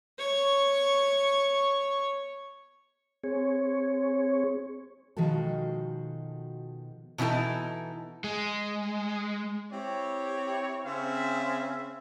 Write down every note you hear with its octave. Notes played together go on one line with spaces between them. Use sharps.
C#5 C#6
C4 G#4 C#5
B2 D#3 F3 G#3 F#4 A4
B2 E3 D#4 E4 A4
G#3
C4 E4 G4 C#5
C#3 C4 C5 E5